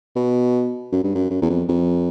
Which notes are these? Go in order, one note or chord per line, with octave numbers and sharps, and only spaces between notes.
B2
F#2
G2
F#2
F#2
E2
F2
F2